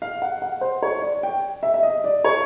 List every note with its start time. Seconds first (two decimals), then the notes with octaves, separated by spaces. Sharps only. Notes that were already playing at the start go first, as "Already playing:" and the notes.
0.02 F5
0.22 F#5
0.42 F#5
0.61 C5
0.82 C#5
1.02 D5
1.23 G5
1.63 E5
1.74 E5
1.83 D#5
2.04 D5
2.24 C#5